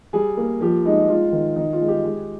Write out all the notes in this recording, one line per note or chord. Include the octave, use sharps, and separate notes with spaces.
G3 G#4
A#3
F3 G4
G#3 D#4
G#3 F4
D#3
D#3 D#4
F4
G#3
G4
G#3